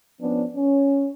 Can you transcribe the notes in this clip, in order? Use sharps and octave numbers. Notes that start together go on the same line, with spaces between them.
F3 B3 C#4 D4
C#4